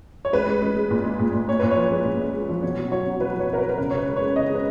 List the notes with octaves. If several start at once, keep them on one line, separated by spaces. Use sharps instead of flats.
C#5
G#3 B4
G#3
G#3
G#3
A#2
G#3
A#2
A#2
A#2 C#5
A#2 B4
C#5
F3
G#3
A#2
G#3
G#3
F3
B2 C#5
F#3
F#3 C#5
B2
F#3 B4
F#3 C#5
B2 A#4
B4
B2
B4
C#3 A#4
C#3 C#5
B4
G#3
C#5
G#3
C#3 D#5
G#3 B4